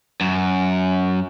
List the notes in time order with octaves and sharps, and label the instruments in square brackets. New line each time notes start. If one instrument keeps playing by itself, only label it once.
[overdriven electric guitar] F#2